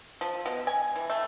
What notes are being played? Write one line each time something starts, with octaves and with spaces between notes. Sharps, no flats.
F3
B2
G#5
E3
A3